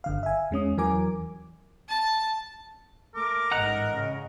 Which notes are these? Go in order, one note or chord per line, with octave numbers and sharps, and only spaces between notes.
G1 D3 F5
E5 G#5
E2 G#3 C#4 D#6
E2 E3 F#3 A#4 G#5 D6
A5
A3 A#4 D6
A1 G#2 D#5 F#5 A#5 F#6
A2 C#3